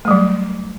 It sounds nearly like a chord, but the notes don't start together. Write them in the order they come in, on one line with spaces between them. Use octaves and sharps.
A3 G3 F#3